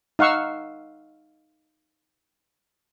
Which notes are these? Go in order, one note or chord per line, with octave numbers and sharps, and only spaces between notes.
D#4 F5 F#5 C#6 E6